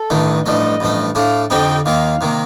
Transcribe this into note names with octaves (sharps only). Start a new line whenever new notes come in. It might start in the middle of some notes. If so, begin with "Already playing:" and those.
Already playing: A4
A1 G2 D#3 A3
A1 G2 F3 A3 D#5
A1 G2 F3 A3
A2 A3 D4 F5
F2 D3 G3 C4 D#4 G5
D#2 D#3 A#3 F4 F5
C3 D#3 A#3